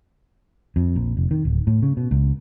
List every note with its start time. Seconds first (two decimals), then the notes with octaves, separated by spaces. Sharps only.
0.76 F2
0.96 A#1
1.17 F1
1.31 D#3
1.45 D1
1.67 A2
1.82 C#3
1.97 B2
2.11 C#2